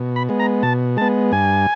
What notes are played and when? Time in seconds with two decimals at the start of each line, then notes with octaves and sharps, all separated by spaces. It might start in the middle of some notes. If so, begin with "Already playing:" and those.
Already playing: B2
0.16 B5
0.29 G#3 B3
0.39 A#5
0.63 B2 A5
0.97 G#3 B3 A5
1.32 G2 G#5